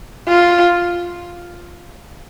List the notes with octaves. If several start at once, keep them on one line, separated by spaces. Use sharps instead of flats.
F4